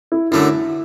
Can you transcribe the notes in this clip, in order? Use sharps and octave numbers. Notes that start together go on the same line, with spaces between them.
E4
F#2 D3 F#3 A3 E4